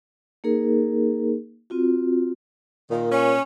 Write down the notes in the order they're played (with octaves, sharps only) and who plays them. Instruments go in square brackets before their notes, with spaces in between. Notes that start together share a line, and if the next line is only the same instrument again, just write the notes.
[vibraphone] A#3 D#4 G#4 A#4
C4 F4 F#4
[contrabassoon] A#2 [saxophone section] D#3
[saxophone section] C#4